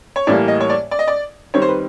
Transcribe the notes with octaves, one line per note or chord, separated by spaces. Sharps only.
C#5
A2 E3 G3 A#3 D5
D#5
C#5
D5
D5
D#5
D5
D#3 G3 C4 C#5
C5
B4